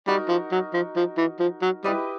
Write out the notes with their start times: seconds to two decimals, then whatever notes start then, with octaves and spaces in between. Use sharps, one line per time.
0.07 G3 D#4 F#4 A#4
0.29 F3
0.52 F#3
0.73 F3
0.96 F3
1.17 E3
1.40 F3
1.62 F#3
1.84 G3 E4 G4 B4 D#5